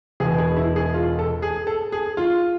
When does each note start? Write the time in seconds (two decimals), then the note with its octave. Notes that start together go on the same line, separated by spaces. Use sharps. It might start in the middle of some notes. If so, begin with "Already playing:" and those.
0.20 E1 E2 B2 G#4
0.38 G#4
0.57 E4
0.76 G#4
0.94 F4
1.19 A4
1.42 G#4
1.67 A4
1.92 G#4
2.17 F4